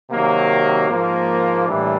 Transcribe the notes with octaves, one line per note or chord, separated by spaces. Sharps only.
C3 D#3 F#3 A#3
G#2 F3 A#3
A2 E3 G3 A#3 D4